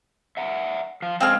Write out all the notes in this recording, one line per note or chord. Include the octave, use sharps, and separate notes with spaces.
E5 F#5 A#5
F3 F5
F2 G#3 C4 G#4 F5 F6